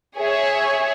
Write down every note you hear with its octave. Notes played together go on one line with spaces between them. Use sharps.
G#4 C#5 E5